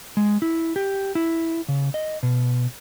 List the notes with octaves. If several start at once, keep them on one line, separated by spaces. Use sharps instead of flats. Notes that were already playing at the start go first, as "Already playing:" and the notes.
G#3
E4
G4
E4
C#3
D#5
B2